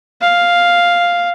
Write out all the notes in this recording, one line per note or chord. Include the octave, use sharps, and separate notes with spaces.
F5